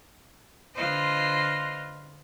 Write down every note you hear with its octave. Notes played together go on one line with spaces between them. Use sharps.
D3 F4 B4 C5 D#5